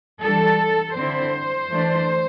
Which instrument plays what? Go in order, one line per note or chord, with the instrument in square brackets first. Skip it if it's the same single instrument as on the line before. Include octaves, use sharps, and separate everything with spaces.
[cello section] E3 G3 D4 A4
D3 C4 E4 C5
E3 A3 D4